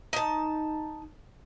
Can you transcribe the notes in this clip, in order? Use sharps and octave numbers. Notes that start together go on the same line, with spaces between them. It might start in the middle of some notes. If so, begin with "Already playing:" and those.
D#4 A5